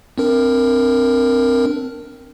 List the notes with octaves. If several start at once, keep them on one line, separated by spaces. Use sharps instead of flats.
C4 D4 A#4